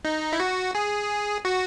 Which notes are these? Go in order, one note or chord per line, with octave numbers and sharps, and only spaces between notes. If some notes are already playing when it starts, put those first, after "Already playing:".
D#4
E4
F#4
G#4
F#4